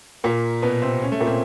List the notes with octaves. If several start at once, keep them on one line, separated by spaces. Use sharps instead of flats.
A#2 A#3
B2 B3
C3 C4
C#3 C#4
A3
A#2 A#3
C4